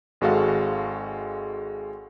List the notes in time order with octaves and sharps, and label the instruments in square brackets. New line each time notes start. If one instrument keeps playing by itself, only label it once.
[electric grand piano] G#1 G#3 F#4 A4 F5